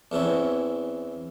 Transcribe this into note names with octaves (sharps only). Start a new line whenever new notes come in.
E2 E3 C4 C#4